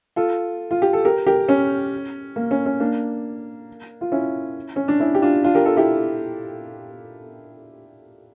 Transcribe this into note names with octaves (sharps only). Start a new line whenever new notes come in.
F4 A4
F4
G4
A4
G4 A#4
G4 A#4
C#4
A#3
C#4
C#4
A#3 D4
F4
C#4 E4
C#4
D4
C#4 E4
G4
D4 F4
D4 F4
G4 A#4
F4 A4
E4 G4